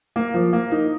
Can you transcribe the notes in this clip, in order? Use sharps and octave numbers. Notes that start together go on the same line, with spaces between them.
A#3
F3
A#3
D#4